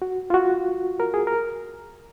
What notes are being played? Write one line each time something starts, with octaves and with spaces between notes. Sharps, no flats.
F#4
F4
F#4
A#4
G#4
A#4